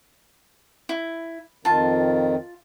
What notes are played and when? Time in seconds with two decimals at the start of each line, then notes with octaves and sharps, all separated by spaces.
0.89 E4
1.65 F2 D#3 F4 A5